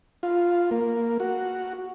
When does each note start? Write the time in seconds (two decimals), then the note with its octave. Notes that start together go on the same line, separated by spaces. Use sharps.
0.23 F4
0.71 A#3
1.20 F#4